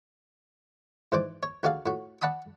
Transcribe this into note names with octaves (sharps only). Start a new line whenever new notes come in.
G#2 E3 C5 D5 D6
C#5
D2 F#4 G#4 D5 F5
A2 F#4
D5 F#5 A5 B5 D#6